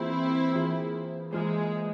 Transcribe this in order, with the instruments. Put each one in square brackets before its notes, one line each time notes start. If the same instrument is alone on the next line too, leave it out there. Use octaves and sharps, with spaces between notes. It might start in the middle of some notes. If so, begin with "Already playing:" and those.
Already playing: [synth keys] E3 A#3 F4 G#4 C5 [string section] C4 E4
[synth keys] E3 A#3 F4 G#4 C5
[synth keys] E3 A#3 F4 G#4 C5 [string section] G#3